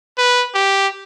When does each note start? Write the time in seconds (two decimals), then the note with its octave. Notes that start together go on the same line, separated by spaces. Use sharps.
0.18 B4
0.54 G4